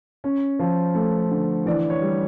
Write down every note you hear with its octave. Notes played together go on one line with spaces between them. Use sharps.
C#4
F3
A3
D3
E3 D5
C#5
G3